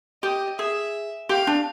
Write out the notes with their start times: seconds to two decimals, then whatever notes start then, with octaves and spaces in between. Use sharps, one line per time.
0.23 G4 D#5
0.59 G#4 E5
1.29 G4 F5
1.47 D4